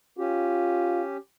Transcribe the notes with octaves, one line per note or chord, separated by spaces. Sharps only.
C#4 F4 G4